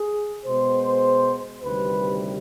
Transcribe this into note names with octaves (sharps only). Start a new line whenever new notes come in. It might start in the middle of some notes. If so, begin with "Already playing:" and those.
Already playing: G#4
B2 G#3 B3 C5
D2 C3 D#3 G3 B4